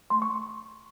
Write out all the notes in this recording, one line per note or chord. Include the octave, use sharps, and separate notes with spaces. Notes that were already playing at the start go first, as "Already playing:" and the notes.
A3 C6
C#6